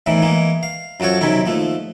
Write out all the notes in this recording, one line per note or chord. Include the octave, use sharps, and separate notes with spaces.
E2 A2 D#3 E3
E3 G#3 A#3
F5
F#2 F3 F#4 A4 C#5
B1 C3 D#3 C#4 E4
D#2 F3 A3